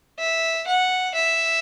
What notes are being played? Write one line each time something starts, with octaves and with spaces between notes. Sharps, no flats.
E5
F#5
E5